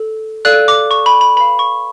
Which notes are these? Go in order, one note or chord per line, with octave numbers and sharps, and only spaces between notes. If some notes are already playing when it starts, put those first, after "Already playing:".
Already playing: A4
A4 D5 F5 F#6
D6
C#6
B5
B5
B4 F5 B5
C#6